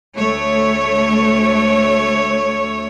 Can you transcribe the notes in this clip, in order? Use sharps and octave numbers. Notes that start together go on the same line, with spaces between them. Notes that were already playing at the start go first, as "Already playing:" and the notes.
D2 A3 C#5